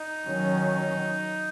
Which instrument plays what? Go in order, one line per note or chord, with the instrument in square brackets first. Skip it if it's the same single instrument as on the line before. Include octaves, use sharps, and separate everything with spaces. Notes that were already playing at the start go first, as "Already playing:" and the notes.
Already playing: [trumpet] D#4
[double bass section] D#3 F#3 C#4